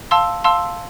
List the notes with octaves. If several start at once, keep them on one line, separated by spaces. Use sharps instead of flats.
F5 A5 C6 E6
F5 A5 C6 E6